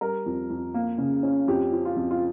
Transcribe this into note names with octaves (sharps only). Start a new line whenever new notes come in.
G3 A#4
F2
F2
A#3
C#3
C#4
F2 G4
F3
F4
F2
F4